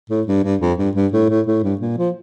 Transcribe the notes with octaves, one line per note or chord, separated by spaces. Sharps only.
A2
G2
G2
F2
G2
G2
A2
A2
A2
G2
A#2
F3